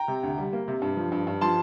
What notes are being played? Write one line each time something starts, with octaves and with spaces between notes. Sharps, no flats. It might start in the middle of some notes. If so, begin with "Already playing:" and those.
Already playing: G5 A#5
C3
D2
G3
A#3
C3
G2
F3
G2
G2
F3 A5 C6